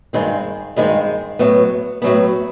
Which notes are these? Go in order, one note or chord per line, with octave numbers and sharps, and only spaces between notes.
G2 D#3 G#3 C4
G2 D#3 G#3 C4
A2 F#3 B3
A2 F#3 B3